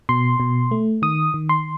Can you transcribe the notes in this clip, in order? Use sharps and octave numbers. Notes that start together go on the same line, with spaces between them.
B2 C6
B2
A3
D#3 D#6
D#3
C6